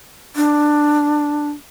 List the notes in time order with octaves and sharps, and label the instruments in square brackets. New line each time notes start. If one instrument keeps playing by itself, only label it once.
[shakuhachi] D4